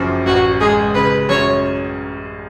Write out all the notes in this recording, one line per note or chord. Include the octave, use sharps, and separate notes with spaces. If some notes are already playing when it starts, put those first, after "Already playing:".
Already playing: F#1 F#2 F3
A1 F#4
G#3 G#4
C#3 B4
F#2 C#5